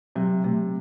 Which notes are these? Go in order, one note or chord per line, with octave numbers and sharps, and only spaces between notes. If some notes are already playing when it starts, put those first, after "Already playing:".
C3 F#3
C3 A3